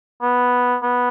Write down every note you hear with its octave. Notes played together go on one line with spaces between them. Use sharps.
B3
B3